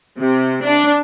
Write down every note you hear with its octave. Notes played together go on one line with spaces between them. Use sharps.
C3
D4